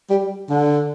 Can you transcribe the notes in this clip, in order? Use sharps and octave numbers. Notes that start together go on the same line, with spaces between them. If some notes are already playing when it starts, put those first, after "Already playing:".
G3
D3